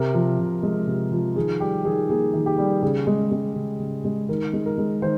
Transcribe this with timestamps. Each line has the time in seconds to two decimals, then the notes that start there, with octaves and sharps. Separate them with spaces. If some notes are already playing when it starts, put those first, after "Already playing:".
Already playing: C3 A#4
0.14 F3
0.39 C3
0.63 G#3
0.87 C3
1.12 F3
1.36 D#3 G#4
1.60 G3 G4
1.85 D#3 G#4
2.09 A#3 G#4
2.34 D#3
2.46 G4
2.58 G3
2.83 C#3 G#4
3.07 G#3
3.31 G#3
3.56 C#3
3.80 C#3
4.05 G#3
4.29 D#3 A#4
4.53 G#3
4.65 A#4
4.78 G#3
5.02 D#3 C5